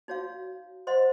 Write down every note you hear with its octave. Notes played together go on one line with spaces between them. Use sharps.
D#4 F#4 C#5 F5
C5 D#5 F#5 C6